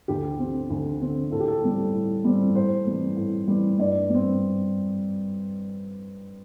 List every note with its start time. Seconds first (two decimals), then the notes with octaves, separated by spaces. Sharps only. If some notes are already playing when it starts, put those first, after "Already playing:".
0.08 D2 G4
0.39 C4
0.44 D3
0.70 D2
1.01 D3 C4
1.31 A2 A4
1.40 G4
1.48 A4
1.63 G3 C4
1.94 A2
2.25 G3 C4
2.55 A2 C5
2.87 E3 G3 C4
3.17 A2
3.47 E3 G3 C4
3.78 G2 D5
4.10 G3 C4